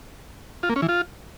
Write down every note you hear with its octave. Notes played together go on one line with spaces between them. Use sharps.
F4
A#3
C#4
E3
F4